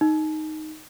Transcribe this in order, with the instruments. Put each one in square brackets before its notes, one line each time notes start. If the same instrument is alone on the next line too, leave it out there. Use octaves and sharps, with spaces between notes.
[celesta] D#4